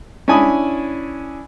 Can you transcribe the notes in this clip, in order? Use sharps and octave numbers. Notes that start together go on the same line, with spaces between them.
C#4 D4 E4 G#5 B5 D#6